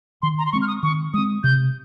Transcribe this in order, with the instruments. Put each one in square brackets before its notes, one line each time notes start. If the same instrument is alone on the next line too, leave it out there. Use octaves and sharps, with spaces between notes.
[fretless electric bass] D#3 [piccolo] C6
[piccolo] A#5
C6
[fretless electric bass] G#3 C4 [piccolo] C#6
[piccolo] F6
D#6
[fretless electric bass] D#3 [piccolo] C#6
[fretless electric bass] G#3 [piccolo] D#6
[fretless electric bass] C4
[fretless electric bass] C3 [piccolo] G6